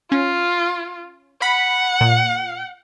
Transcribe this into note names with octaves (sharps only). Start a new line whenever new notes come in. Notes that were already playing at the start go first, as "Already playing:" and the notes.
C#4 F4
F#5 B5
A#2